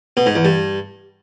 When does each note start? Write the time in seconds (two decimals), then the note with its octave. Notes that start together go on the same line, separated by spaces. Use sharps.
0.17 B2
0.26 G#2
0.35 E2
0.45 G2